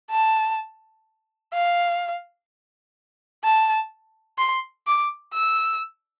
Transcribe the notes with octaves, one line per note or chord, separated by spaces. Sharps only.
A5
F5
A5
C6
D6
E6